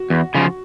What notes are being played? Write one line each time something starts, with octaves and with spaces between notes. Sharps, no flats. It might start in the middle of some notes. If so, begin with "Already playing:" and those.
Already playing: F#4
E2
C#3 F3